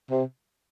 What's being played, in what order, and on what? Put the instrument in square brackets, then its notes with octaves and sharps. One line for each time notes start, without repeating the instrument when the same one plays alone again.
[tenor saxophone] C3